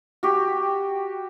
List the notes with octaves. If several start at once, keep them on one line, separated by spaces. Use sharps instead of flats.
F#4 G4